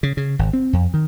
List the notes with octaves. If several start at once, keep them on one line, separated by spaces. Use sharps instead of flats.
C#3
C#3
G#1
C4
F2
D#3